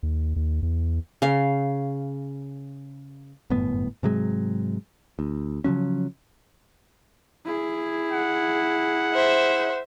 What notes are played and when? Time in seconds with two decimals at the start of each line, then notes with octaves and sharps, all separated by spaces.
0.03 D#2
0.36 D#2
0.63 E2
1.22 C#3 F5
3.50 G1 F#2 A2 B3
4.03 G#2 C3 F#3 G#3
5.19 D2
5.64 C#3 F3 F#3 C#4
7.45 E4 G#4
8.12 F#5
9.14 C5 E5